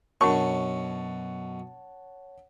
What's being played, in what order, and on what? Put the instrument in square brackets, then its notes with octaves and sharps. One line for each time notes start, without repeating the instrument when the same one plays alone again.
[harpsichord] F#2 B2 [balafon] D4 A#4 [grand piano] C#5 F#5 A5 [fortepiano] C#6